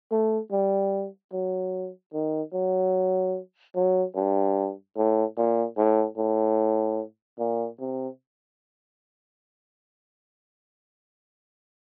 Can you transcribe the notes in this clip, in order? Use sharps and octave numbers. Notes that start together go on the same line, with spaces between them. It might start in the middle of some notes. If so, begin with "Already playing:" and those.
A3
G3
F#3
D#3
F#3
F#3
G2
A2
A#2
A2
A2
A#2
C3